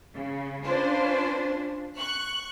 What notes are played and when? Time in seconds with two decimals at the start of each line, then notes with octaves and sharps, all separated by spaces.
0.14 C#3
0.63 C#4 D4 F4 B4 C5
1.95 C#6 F#6